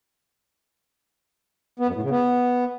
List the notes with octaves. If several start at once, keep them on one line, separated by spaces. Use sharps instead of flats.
B3
F#2
A2
C#3
B3